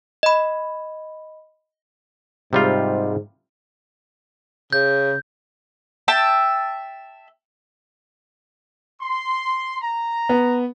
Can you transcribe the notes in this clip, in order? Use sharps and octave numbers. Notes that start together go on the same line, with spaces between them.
D#5 B5
G#2 C3 G3 F4
C#3 G6
E5 G5 A5
C6
A#5
B3